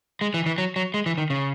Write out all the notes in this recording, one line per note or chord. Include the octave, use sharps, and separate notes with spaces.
G#3
E3
E3
F#3
F#3
G#3
E3
D#3
C#3